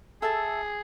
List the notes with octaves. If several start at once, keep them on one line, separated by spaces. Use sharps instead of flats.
G#4 A4 E5 A5